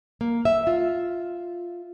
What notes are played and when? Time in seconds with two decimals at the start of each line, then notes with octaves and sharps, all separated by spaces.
0.21 A#3
0.45 E5
0.67 F4